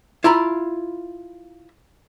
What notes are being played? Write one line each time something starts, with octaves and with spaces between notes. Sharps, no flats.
E4 F4 A#5 B5